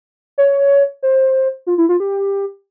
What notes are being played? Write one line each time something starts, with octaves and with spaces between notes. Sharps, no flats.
C#5
C5
F4
E4
F4
G4